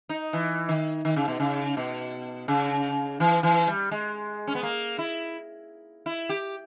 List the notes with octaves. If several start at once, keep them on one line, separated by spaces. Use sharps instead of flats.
D#4
E3
D#3
D#3
C#3
B2
C#3
B2
C#3
E3
E3
G3
G#3
C#4
B3
A#3
E4
E4
G4